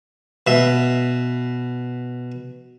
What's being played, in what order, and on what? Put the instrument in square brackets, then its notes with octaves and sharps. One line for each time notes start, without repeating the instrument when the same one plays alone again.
[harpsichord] B2 E5